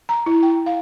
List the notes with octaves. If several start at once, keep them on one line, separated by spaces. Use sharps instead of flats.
A#5
E4
G5
F5